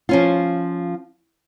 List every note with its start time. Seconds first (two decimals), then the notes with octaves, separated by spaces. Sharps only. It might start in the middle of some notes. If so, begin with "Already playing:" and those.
0.09 F3 C#4 F4